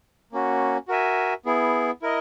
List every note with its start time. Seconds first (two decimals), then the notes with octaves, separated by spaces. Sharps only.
0.32 A#3 C#4 F#4
0.88 F#4 A#4 E5 G#5
1.46 B3 E4 G#4
2.02 E4 A#4 D#5